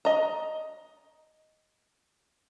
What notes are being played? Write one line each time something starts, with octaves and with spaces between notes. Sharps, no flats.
D#5 A#5